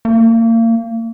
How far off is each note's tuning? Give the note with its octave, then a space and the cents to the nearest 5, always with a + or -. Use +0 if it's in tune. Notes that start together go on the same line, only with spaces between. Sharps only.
A#3 -35